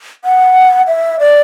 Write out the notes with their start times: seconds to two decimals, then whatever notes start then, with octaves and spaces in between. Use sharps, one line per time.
0.24 F#5
0.87 E5
1.20 D5